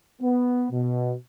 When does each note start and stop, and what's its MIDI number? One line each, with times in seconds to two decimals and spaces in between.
0.21 0.66 59
0.71 1.14 47